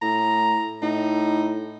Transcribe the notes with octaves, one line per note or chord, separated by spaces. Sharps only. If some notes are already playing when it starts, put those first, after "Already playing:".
A2 A#5
A2 D#4